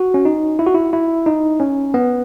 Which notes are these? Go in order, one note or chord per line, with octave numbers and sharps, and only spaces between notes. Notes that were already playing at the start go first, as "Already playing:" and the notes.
Already playing: F#4
C#4
D#4
E4
F#4
E4
E4
D#4
C#4
B3